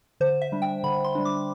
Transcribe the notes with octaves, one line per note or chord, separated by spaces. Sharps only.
D3 C5
E5
G3 D4
G5
D3 B5
C6
G3 D4
D6